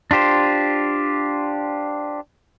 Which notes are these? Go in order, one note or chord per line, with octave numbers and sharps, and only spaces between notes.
D4 F4 G4 C5